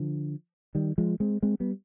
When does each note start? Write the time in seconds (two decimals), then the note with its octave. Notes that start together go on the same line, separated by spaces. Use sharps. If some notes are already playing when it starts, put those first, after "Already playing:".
Already playing: D3 F3
0.75 D#3 G3
0.98 F3 G#3
1.20 G#3 C4
1.42 G#3 C4
1.60 G3 B3